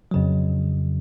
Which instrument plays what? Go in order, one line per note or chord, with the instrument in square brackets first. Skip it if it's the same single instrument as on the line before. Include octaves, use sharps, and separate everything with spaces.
[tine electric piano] F2 C#3 F#3